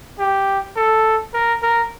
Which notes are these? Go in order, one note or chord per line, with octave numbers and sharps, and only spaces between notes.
G4
A4
A#4
A#4